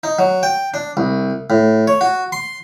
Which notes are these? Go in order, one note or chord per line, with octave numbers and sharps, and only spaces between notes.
D#4
F#3
G5
D4
C2
A2
C#5
F#4
C6